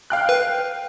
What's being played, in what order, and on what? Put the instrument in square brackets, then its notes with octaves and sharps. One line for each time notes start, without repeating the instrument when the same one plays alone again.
[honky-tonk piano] F5 G5 F#6
[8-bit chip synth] B4